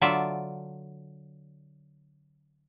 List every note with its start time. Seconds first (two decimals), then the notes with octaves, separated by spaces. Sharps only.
0.01 D3 F#3 F4 D5 E5 A5